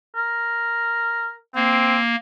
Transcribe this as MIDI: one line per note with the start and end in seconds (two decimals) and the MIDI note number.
0.16 1.34 70
1.55 2.16 58
1.55 1.97 60